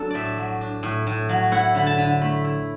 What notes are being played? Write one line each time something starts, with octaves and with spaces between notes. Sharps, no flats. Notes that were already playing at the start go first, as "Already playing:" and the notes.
Already playing: F#3 D4 A4
A2 D5 E5
F#3
D4
A2
A2
F#3
E4 F#5
D3 B5
A5
D3
A3 B5
E4